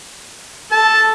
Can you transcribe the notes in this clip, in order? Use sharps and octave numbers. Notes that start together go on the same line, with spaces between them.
A4 A5